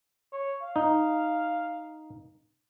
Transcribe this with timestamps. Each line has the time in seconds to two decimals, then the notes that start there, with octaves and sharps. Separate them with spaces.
0.32 C#5
0.62 F5
0.76 D#4